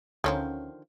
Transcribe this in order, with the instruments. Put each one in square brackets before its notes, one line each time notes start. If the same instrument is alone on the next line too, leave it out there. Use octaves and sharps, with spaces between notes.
[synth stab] D2 C#4 [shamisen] D3 D#3 F3